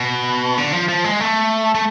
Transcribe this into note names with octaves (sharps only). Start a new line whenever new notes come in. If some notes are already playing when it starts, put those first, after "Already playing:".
Already playing: B2
D3
F3
F3
G#3
A3
A3